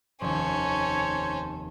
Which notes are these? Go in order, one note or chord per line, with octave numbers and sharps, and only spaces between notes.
F1 D#2 C#4 A4 C5 C#5